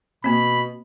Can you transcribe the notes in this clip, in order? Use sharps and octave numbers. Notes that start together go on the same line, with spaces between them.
B2 A#3 C4 B5